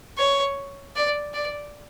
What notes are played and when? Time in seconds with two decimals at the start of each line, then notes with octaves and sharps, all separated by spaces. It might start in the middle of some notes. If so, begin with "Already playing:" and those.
0.18 C#5
0.96 D5
1.34 D5